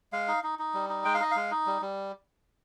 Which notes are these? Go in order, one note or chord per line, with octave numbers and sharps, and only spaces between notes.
G#3 F5
D#4
D#4
D#4
G3
D#4
G#3 G5
F5
D#4 D#5
G#3 F5
D#4
G3
G3